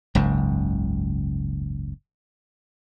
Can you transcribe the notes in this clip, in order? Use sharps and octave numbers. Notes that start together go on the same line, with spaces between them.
F#1 C#2 G#2